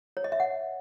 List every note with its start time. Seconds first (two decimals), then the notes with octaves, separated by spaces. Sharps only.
0.17 C#5
0.24 D#5
0.32 E5
0.40 F#5